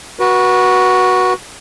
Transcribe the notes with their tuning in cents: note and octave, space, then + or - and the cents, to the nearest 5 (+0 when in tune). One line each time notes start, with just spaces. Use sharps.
F#4 +0 B4 -30